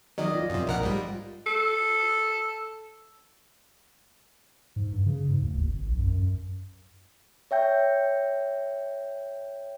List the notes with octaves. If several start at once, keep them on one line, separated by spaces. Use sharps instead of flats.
D#3 F#3 D5 D#5
F4
F#2 C3
A#1 A#4 F#5
G#2 G3
A4
G#2
G2
C#3
G#2
D2
F#1
G#1
B1
F#2
F#2
C#5 E5 G5 G6